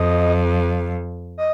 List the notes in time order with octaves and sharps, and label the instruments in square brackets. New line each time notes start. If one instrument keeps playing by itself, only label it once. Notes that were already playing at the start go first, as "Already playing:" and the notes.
Already playing: [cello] F2 [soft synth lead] D#5
[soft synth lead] D#5